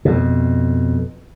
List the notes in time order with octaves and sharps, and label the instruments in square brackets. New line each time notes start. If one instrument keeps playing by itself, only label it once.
[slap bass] F2 B2